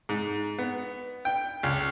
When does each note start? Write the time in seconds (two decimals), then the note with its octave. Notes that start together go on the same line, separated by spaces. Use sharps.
0.09 G#2
0.59 B3
1.25 G5
1.63 C#2